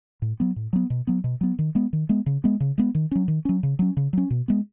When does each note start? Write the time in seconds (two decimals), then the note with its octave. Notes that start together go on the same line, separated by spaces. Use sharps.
0.22 A2
0.40 F#3 B3
0.56 A2
0.73 F#3 B3
0.90 B2
1.07 F#3 B3
1.24 B2
1.41 F#3 B3
1.59 D#3
1.75 G#3 B3
1.93 D#3
2.09 G#3 B3
2.26 C#3
2.44 G#3 B3
2.60 C#3
2.78 G#3 B3
2.95 D#3
3.11 F#3 C#4
3.28 D#3
3.45 F#3 C#4
3.63 C#3
3.79 F#3 C#4
3.97 C#3
4.13 F#3 C#4
4.30 B2
4.48 G#3 B3